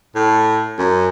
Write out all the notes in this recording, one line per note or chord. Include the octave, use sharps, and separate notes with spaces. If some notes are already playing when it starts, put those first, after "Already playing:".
A2
F#2